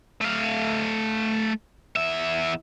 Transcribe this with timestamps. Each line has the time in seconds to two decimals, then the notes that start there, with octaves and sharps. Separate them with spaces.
0.21 A3 F5
1.96 E2 E5